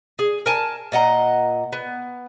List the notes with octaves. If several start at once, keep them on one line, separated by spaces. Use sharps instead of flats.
G#4
A#4 G#5 A5
A#2 D#5 F#5 A#5
B3